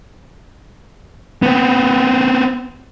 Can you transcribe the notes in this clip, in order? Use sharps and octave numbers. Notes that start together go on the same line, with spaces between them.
B3 C4